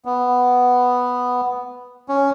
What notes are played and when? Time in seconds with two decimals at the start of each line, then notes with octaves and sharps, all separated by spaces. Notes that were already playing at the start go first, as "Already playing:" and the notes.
0.05 B3
2.09 C#4